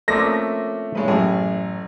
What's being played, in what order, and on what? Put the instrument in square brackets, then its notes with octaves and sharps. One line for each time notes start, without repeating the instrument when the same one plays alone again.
[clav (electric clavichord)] F3 C4 C#4 [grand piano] A3 A#6 [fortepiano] A#3 D5 E5
[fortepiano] G2 G#3 C#5 [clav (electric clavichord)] A#4 B4
[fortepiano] A1 F#2 G#4 [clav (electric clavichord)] A2